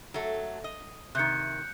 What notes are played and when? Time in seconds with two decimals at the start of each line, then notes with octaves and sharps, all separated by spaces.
0.14 F#3 A3
0.64 D#5
1.15 C3 D#3 F#6 G6 C#7